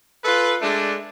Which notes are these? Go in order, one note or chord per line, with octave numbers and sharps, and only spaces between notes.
F4 A4 B4
G#3 A3 D4